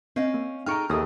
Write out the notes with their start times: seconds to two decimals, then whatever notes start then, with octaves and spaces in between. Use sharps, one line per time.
0.16 C4 C#4 D#5 F5
0.34 A#3
0.66 D#4 G#4 A4 G5 A#5 C#6 F6 D7
0.90 D#2 E3 D#4 G#4 A4 D#6 F6